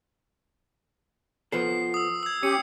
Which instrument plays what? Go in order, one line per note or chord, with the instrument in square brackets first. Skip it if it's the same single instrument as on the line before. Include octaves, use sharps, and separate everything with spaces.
[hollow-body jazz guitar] F3 B3 A4 [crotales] C7
[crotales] D#6 E6
E6 G#6
[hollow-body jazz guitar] C#4 [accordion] G4 [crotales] C#7